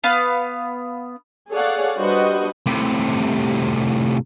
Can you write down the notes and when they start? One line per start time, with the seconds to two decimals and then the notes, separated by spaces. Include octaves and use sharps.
0.04 B3 F5
1.50 G#4 A4 C#5 D5 F5 F#5
1.97 G3 D4 F#4 B4 C5 D#5
2.66 A2 C3